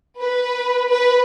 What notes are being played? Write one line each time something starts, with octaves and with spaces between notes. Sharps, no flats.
B4
B4